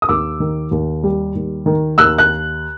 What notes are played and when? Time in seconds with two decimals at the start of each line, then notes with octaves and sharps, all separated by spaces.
0.02 D#6
0.09 D#2 D6 E6
0.40 D#3
0.71 D#2
1.03 G3
1.35 D#2
1.66 D#3
1.98 D#2 E6 F#6
2.18 F#6